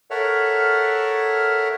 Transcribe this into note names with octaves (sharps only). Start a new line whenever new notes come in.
A4 A#4 C#5 E5 F#5 F6